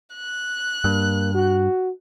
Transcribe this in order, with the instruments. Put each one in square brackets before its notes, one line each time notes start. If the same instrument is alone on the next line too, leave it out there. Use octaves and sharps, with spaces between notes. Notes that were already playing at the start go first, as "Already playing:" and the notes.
[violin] F#6
[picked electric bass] G2 [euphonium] A#3
[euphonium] F#4